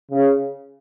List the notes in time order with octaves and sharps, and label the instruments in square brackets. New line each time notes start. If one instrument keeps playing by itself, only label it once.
[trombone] C#3